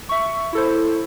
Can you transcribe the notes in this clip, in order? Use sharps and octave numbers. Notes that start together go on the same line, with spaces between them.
E5 C#6
E4 A4 C5